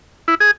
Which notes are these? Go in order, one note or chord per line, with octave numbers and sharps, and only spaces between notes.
E4
G#4